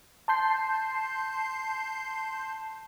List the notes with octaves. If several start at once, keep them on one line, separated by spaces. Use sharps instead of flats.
A5 C6 G6 C7